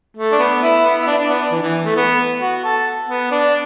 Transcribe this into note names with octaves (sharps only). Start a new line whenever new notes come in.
A3
D4
B3
E4
B3
E4
D4
D4
B3
D4
E3
E3
A3
B3
F#4
A4
B3
D4